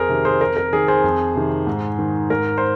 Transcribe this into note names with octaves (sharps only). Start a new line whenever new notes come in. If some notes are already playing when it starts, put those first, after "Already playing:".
Already playing: F2 G#4 A#4 C5
C3 D#3
G#4 C5
F2 A#4
A#4
D#3 G#4
G#4 C5
F2
C3 D#3
G#2
D#3
G#2 A#4
C5